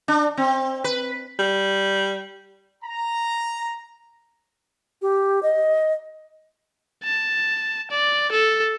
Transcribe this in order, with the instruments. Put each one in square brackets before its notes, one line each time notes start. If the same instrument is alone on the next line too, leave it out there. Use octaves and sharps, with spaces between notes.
[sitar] D4
C4
B4
[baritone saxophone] G3
[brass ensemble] A#5
[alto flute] G4
D#5
[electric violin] A5
D5
A4